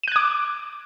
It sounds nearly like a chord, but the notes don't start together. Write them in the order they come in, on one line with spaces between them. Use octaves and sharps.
D#7 F#6 G#6 D6